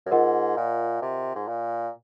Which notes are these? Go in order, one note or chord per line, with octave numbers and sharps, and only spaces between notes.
F#2
G#2 F4 A#4 D#5 F#5
A#2
C3
G#2
A#2